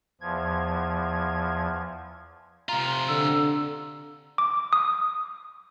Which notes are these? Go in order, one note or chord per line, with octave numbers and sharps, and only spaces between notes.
E2 F3 G#6
C3 F4 A#5
D3 E6
D6
D#6